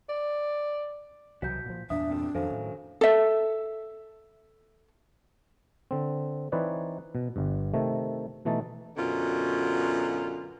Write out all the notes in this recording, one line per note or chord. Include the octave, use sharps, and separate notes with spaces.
D5
C2 B2 E3 F#3 F#4 G6 B6
A#2 F3
E2 G2 A#2 D4 E5 D#6
C4 F#4 A4
F2 D#3 F#3 C#4 A4 C5 F5
A2
A4 E5
D3 C4
E3 C4 D#4 B4 C#5 D5
B2
G1 G2
C3 D#3 A3
B2 E3 A3 D#4 A5
F#2 B2 D3 F4